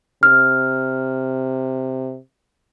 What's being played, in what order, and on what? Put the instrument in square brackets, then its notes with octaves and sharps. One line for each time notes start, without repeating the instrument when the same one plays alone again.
[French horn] C3 [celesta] F6